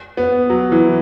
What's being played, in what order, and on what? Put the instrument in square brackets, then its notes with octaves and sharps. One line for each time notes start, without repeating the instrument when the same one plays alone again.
[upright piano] B3
F#3
E3